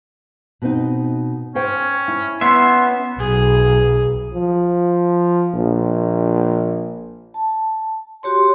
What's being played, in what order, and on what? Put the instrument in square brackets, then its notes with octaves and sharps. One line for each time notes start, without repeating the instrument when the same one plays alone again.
[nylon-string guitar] B2 C4 D#4
[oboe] C#4 [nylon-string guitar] C5 G5
[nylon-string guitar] E4
[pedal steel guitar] B3 C#4 E5 [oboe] C6
[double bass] B1 [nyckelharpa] G#4
[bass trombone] F3
A#1
[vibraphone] A5
F#4 G4 C#5 C6